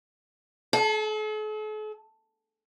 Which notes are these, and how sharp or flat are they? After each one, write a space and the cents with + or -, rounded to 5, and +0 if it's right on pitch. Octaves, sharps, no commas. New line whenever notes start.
A4 -45